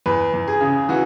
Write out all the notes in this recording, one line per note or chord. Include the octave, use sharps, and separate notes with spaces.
E2 B4
E2
G#4
C#3
E3 F#4